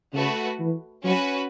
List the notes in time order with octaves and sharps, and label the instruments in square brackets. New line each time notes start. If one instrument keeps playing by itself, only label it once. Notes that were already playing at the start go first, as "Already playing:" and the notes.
[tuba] C#3 [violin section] A3 F#4 B4
[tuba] E3
[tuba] F#3 [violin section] C#4 F#4 B4